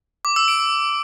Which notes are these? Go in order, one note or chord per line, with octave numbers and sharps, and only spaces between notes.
D6
E6
D7